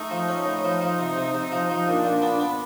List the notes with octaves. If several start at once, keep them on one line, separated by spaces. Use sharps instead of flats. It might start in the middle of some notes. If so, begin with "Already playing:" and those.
Already playing: A3 D#4
F3
C#4
A2
F3
F3
C3
C3
C3 D#4
F3
F3
A#2 D4
A#2
B3
B3